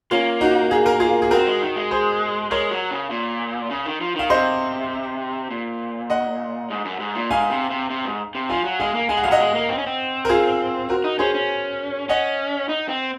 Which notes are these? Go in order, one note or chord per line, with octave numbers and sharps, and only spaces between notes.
A#3 C#4 F4
D#4 F#4
G#4
A#4
F4 G#4
G#4
C4 F#4 A#4
G#3
D#3
G#3
G#4 C5
G#3 A#4 C#5
F#3
C#3
A#2
C#3
D#3
F3
D#3 F5
C3 C5 D#5
A#2
D#5 F#5
G#2
F#2
G#2
A#2
G#2 F5 G#5
C3
C3
C3
G#2
C3
F3 F5 G#5
F#3
G#3 F5 G#5
A#3
G#3 G#5
F#5
F#3 F5
D#5 F#5
G#3
A#3
C4
C#4
C4
A#4
F4 G#4
F#4 A#4
D#4
C#4 G#4 C5
C#4
C#4 D#5 F#5
D#4
C4